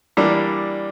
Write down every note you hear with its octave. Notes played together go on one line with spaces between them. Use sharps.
E3 G3 A#3 D4